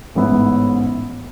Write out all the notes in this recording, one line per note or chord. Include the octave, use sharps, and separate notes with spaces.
A1 G#2 E3 B3 E4